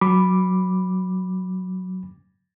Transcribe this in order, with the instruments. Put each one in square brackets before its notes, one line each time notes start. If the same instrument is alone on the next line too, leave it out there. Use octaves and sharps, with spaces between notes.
[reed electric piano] F#3 B5 D6